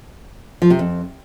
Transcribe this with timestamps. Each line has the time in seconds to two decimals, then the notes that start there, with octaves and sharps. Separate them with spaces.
0.62 F3
0.70 C3
0.79 F2